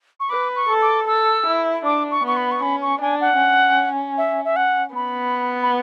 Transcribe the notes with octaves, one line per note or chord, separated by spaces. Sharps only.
C#6
B4 D6
C#6
A4
D6
A4 E6
E4
D4 D6
C#6
B3 C#6
B5
C#6
C#4 B5
C#6
D4 G#5
F#5
C#4
E5
E5
F#5
B3 B5
B5